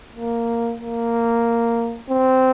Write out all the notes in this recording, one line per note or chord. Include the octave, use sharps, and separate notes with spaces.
A#3
A#3
C4